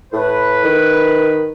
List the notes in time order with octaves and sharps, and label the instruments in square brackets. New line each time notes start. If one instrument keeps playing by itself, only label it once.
[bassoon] A2 [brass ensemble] B4
[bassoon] D#3